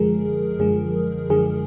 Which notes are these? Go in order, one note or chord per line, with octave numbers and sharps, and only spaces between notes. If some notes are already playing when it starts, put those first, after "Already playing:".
Already playing: F#2 D3 F3 G#3 G#4 A#4
F#2 D3 F3 G#3 G#4
F#2 D3 F3 G#3 G#4